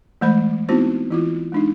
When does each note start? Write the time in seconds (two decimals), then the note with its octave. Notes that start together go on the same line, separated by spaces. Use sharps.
0.21 E3 G#3 A3 C5 B5
0.69 B3 C4 D#4 E4 F#4 C5
1.10 E3 E4 F4
1.52 G#3 D4 D#4